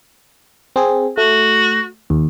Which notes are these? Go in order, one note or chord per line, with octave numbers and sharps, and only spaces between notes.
C4 G#4
A3 F#4
D#2